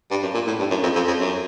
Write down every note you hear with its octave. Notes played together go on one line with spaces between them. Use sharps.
G2
F#2
A#2
A2
G2
F#2
F2
F2
F2
F#2